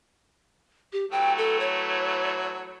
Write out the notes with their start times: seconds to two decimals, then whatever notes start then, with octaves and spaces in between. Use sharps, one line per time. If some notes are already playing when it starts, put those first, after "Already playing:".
0.93 G4
1.11 E3 F#3 A3 G5
1.38 A4
1.60 C#5